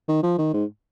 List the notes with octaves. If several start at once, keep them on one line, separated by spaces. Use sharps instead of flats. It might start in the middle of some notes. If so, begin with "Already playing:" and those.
D#3
F3
D#3
G#2